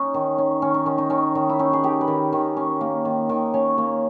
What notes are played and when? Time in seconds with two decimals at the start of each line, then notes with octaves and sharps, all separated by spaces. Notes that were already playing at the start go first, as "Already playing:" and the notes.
Already playing: C#4 D#4
0.14 D#3
0.38 C#4
0.62 D#3 C#4
0.74 D#4
0.86 D#3 C#4
0.98 D#4
1.10 D#3 C#4
1.35 D#3 D#4
1.49 E4
1.59 C#4 D#4
1.73 G#4
1.83 D#3 G4
2.01 B4
2.08 D#3 A#4
2.33 D#3
2.57 C#4
2.81 A#3
3.05 D#3
3.29 D#3
3.54 C#4 C#5
3.78 A#3